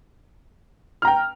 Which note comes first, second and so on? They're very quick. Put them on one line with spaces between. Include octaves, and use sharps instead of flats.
F6 A#5 G5